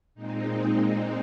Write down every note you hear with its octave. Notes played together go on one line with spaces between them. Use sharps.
A#2 G#3 C4 D#4